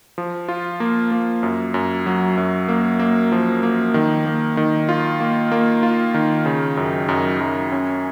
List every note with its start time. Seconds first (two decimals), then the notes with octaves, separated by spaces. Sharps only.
0.18 F3
0.49 F4
0.80 A#3
1.11 A#3
1.43 F#2
1.74 F#2
2.06 F#3
2.37 F#2
2.69 A#3
2.99 A#3
3.32 F3
3.63 A#3
3.94 D#3
4.26 A#3
4.57 D#3
4.89 F4
5.20 A#3
5.52 A#3
5.83 F4
6.14 D#3
6.46 C#3
6.77 F#2
7.09 F#2
7.40 F#2
7.72 C#4